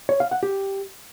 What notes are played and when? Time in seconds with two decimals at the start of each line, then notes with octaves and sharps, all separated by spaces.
0.09 C#5
0.20 F5
0.31 F#5
0.43 G4